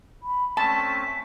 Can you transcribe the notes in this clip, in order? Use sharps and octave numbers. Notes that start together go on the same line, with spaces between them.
B5
A3 C4 C#4 A5 B6